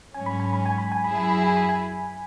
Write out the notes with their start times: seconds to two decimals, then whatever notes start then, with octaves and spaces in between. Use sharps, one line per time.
0.14 G#2 F#3 C#4 G#5
0.26 B5
0.40 G#5
0.53 B5
0.66 G#5
0.78 B5
0.92 G#5
1.04 F#2 F#3 E4 G#4 B5
1.18 G#5
1.30 B5
1.44 G#5
1.57 B5
1.69 G#5